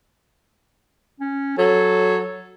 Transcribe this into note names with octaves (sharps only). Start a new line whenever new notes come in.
C#4
F#3 A4